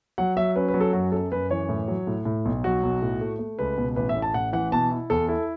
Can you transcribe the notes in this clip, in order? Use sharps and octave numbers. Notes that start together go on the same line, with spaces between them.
F#3 F#5
F#3 E5
C#4 B4
B4
F#3
A4
F#2 F#4
F#2 A4
F#2 B4
E3 C#5
A2
F#3
A2
A2
B1
F#3 F#4
B1
A2
A3
A3
C#2 B4
B2
A1 B4
E5
A2
A5
A1 F#5
E3 F#5
B2 A5
E4
E2 A4
E4 A4